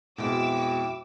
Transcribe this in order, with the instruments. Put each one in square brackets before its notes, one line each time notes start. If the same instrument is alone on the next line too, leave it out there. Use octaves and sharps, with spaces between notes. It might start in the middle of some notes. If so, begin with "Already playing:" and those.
[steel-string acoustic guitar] F2 E4 G5 [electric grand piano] B2 G#3 [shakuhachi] F#4 [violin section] D6 E6